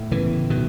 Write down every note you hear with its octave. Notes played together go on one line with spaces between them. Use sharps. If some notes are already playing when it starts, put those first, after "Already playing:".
Already playing: A2
C#3 E3 B3
B2 D#3 F#3